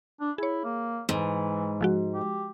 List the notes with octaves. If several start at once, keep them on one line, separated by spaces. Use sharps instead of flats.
D4
E4 G#4 C#5
A#3
G#2 E3
F3 G#3 F#4
G4